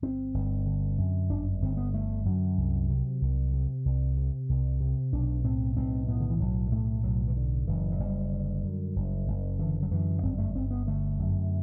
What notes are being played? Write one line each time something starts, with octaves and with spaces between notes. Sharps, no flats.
G1 C4
G1
D3
F#2
G1 D4
G1 C4
B3
D3 A3
F#2 F#3
C2
C3
C2
C3
C2
C3
C2
C3
B1 D4
A2 C4
B1 C4
A2 B3
D3
E3
B1 F#3
A2 A3
B1 F#3
E3
A2 D3
F#1 E3
F#3
F#1 G3
D3
F#2
F#1
F#1
D3 E3
F#3
F#2 E3
G1 C4
A3
G1 C4
B3
D3 A3
F#2